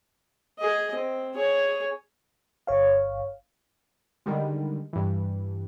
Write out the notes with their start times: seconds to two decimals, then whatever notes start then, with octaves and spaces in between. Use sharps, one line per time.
0.59 G#4 D#5
0.94 C4
1.35 G#4 C#5
2.67 G1 C#5 F5
4.26 D3 D#3 G3 G#3
4.93 G2 E3